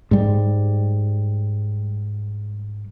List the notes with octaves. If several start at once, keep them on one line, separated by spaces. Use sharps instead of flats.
G#2 G3